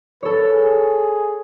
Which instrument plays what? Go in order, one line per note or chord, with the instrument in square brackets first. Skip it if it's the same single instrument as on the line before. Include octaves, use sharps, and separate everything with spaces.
[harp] A4 C#5 [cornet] B4
[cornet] G#4